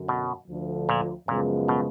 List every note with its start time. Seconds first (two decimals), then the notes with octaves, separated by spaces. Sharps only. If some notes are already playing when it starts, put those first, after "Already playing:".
Already playing: F#2 D3 F#3
0.08 B2
0.48 D2 D3 F3
0.89 A#2
1.28 F#2 A#2 C#3 F3 G#3 B3
1.68 B2